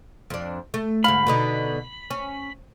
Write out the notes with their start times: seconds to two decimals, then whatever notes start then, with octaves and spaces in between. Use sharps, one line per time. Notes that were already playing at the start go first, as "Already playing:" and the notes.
0.30 F2 D4
0.74 A3
1.04 D2 G#2 F5 B5
1.27 B2 D3 D#4
2.11 C#4